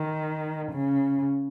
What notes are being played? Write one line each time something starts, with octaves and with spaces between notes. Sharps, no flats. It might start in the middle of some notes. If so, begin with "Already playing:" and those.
Already playing: D#3
C#3